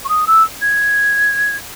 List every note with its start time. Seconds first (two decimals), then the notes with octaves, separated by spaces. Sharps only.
0.05 C#6
0.09 D#6
0.27 E6
0.61 G#6